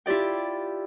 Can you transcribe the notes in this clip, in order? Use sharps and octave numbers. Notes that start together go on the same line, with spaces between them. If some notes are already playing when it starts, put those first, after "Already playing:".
E4 F4 G4 D5 G5